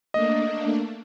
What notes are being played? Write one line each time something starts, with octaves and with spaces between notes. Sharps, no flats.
A3 A#3 D4 D#5